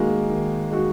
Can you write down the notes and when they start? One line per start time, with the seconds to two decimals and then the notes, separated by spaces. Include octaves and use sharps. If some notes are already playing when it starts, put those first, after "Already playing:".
Already playing: D#3 G#3 A#3 D#4 F#4
0.28 D#3
0.71 G#3 D#4 F#4